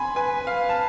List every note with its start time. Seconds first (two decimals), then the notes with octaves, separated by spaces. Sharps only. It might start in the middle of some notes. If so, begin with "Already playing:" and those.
Already playing: G#5 B5 C6
0.16 B4 G#5
0.47 F5
0.69 A5